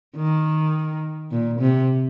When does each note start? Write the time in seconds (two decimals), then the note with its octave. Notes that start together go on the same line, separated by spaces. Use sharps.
0.16 D#3
1.31 A#2
1.60 C3